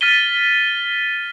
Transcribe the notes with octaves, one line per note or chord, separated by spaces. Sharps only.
F6 A6 B6 D#7 G7